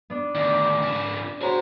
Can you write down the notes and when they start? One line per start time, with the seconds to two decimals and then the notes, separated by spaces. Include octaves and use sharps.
0.10 B3 D4
0.35 D2 D#3 D5
0.82 C#3 F3
1.42 F#4 G#4 C5 C#5 A#5